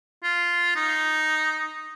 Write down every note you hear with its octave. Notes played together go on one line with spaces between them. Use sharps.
F4
D#4